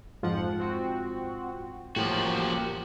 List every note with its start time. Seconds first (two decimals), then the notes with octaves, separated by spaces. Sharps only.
0.23 F2 G#2 F3 F4 F#5
0.60 C4 F#4
1.96 A1 A2 F3 A#3 F#4 G4